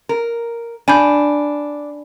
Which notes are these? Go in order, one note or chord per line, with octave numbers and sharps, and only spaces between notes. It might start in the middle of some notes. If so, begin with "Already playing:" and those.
A#4
D4 G#5 B5 G6